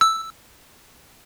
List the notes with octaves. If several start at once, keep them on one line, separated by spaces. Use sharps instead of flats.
E6